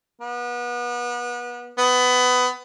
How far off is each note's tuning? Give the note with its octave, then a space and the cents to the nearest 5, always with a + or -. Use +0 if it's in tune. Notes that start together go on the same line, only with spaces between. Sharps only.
B3 -30
B3 +20